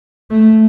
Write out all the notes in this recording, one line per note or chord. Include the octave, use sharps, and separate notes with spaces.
A3